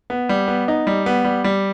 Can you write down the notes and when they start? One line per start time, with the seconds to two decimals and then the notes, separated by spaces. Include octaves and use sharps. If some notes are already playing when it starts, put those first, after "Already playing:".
0.10 B3
0.29 G3
0.48 B3
0.68 D#4
0.87 G3
1.06 B3
1.24 G3
1.44 G3